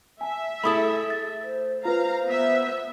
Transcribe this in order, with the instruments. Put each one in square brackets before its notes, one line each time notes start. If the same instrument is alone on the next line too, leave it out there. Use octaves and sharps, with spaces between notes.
[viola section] E5 [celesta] G#5 A5
[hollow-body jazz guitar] A3 E4 A4 [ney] G#4 [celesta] B5 D#6
[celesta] A6
[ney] C5
[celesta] F4 B4 [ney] C5 [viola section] F5 A#5
[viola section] B3 E5